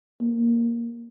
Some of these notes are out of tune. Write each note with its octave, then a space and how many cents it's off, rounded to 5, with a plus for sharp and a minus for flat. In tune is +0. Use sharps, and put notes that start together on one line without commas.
A#3 +0